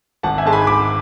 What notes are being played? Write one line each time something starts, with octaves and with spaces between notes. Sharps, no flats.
G#1 F#5 A5
E5 G#5
G#2 G#3 A5
G#5 B5
G#1 B5 D6